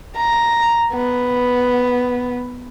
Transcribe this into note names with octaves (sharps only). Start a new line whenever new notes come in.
A#5
B3